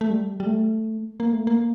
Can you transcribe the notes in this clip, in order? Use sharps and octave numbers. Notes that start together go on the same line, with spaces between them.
A3
G3
G3
A3
A#3
A3
A#3